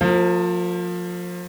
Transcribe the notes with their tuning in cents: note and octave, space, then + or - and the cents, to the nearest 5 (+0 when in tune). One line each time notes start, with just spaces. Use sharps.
F3 +25 A#3 -35 C5 +30